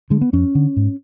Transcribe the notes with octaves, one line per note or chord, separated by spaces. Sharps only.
D3 G#3
B3
F2 C#4
D3
G#2